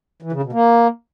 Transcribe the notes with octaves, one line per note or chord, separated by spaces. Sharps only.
E3
C#3
B2
A#3